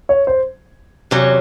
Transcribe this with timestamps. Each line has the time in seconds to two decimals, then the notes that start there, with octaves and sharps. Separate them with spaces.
0.09 C#5
0.27 C5
1.11 E2 C3 F#3 C#4